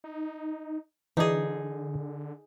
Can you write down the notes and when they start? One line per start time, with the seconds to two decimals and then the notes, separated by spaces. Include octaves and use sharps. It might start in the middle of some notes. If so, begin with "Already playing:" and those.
0.04 D#4
1.17 D3 E3 D4 D#4 G#4 D#5